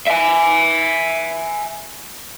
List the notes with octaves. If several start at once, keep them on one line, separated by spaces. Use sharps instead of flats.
E5 G#5